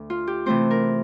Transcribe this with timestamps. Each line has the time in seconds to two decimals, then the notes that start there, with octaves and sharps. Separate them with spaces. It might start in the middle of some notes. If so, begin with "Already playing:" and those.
Already playing: D2
0.10 F4
0.27 G4
0.46 C3 E3 A3 C4 C5
0.71 A#4